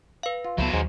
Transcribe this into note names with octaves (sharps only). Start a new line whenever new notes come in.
B4 F5
F4
C#2 F#3 B3 E4 A4 C5
D#2 G#2